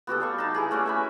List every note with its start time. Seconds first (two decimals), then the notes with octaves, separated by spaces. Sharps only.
0.07 B3 F#4 G4 A4
0.20 G3 F5 C#6
0.38 D#4 A5
0.55 E4 G4 G#4
0.71 A3 C#4 F#4 D6
0.86 E5 G#5 B5